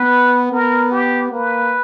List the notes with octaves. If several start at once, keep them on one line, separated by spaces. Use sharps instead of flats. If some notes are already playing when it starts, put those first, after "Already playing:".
Already playing: B3 B4
B3 A#4
G4
A#3 B4